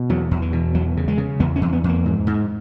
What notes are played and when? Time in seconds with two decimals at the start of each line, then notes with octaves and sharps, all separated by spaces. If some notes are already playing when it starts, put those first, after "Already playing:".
Already playing: B2
0.09 E2 F#3
0.31 E2
0.42 E3
0.53 B2
0.75 E2 F#3
0.97 C#3
1.08 G#3
1.18 C#3
1.40 E2 B3
1.56 C#4
1.61 E2
1.73 B3
1.84 E2 A#3
2.06 G#2
2.27 G#2